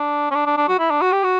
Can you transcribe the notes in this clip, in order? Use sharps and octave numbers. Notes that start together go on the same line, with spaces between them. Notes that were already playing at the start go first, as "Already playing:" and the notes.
Already playing: D4
C#4
D4
D4
D4
F#4
E4
D4
F#4
G4
F#4